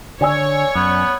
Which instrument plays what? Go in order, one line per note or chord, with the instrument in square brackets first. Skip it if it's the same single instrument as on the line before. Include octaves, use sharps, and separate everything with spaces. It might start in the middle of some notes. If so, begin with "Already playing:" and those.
[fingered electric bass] D3 [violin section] C#5 [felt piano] D5 G#5 E6
[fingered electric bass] F#2 [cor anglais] B3